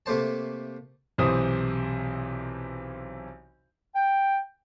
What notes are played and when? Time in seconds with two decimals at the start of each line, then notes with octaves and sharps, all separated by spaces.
0.06 C3 A3 A#3 C5 A5
1.18 B1 C3 E3 C5 D#6
3.94 G5